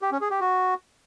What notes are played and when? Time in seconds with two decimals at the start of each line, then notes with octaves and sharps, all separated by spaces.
0.02 G4
0.11 C#4
0.21 G#4
0.31 G4
0.40 F#4